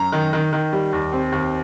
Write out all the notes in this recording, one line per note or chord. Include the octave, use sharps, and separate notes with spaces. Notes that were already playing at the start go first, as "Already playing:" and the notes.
Already playing: F#2 A#5
D#3
D#3
D#3
G3
D#2
C4
D#2